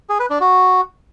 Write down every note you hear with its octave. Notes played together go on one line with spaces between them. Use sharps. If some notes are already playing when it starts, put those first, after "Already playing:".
G#4
B4
D4
F#4